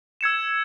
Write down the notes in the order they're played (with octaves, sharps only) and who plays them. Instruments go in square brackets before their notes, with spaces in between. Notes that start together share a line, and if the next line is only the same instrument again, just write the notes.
[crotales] E6 G#6 C#7 E7